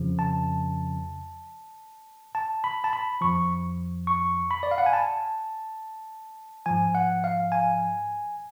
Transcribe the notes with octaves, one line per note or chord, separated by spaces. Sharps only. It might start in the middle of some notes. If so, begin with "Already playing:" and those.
Already playing: F2 C#3 F3
A5
A5
B5
A5
B5
F2 F3 C#6
C#6
B5
D5
F5
F#5
G#5
A5
G#2 F3 G#5
F#5
F5
G#5